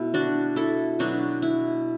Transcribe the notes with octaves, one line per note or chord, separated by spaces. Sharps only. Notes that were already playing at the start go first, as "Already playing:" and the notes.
Already playing: B2 A3 E4
D4 F#4
E4 A4
B2 F#3 B3 D4 F#4
E4